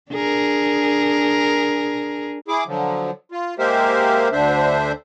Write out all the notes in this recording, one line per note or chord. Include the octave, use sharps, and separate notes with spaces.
D4 G#4 A#4
E4 G#4 D6
D3 F3 F#3
F4
G#3 A#3 G4 A#4 C5 E5
D2 D3 D4 C5 E5